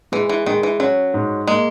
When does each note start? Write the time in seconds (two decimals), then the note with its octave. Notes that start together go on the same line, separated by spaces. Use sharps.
0.12 E3 G#3
0.29 E3
0.46 D#3 G#3
0.63 E3
0.80 F#3 C#4
1.14 G#2
1.47 G#3 A#3